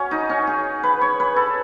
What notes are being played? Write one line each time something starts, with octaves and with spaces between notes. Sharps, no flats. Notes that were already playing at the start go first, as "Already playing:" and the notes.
Already playing: C#4 F#4
D#4
C#4
G#4
B4
C#5
B4
A4